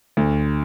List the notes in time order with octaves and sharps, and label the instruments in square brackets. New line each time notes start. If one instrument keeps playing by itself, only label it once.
[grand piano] D2